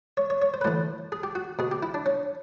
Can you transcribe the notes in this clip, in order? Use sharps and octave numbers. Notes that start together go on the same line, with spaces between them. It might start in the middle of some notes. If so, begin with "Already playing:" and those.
C#5
C#5
C#5
C5
B4
A2 E3 C5
G#4
G4
F#4
B2 G#4
G4
E4
D4
C#4